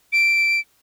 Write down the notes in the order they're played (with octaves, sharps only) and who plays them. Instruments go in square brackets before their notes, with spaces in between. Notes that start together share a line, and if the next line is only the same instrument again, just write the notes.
[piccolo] D7